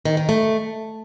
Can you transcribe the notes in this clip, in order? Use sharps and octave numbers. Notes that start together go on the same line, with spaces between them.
D#3
D#3
A3